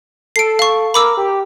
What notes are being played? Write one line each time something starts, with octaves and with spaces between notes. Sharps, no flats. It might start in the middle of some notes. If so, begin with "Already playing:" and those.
A4 C7 D7
F5 C#6
A#4 B5 D6 E6
G4